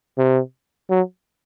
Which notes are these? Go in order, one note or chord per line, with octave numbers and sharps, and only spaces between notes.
C3
F#3